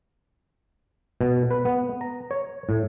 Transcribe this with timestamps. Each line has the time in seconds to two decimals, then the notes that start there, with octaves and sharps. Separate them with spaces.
1.21 B2
1.51 B4
1.65 B3
2.01 A#5
2.31 C#5
2.69 A2